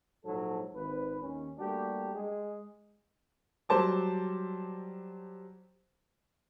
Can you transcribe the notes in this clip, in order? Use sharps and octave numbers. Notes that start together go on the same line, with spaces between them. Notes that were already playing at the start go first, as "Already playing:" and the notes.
A#1 G#2 F#3 A4
G#1 B4
D#2 C#4
G3 A3 A#3 D4 F#4 G4
G#3 G#4
F#3 G3 C5 A5 D6